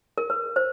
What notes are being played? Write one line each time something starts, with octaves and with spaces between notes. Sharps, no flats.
A#4
B4
C5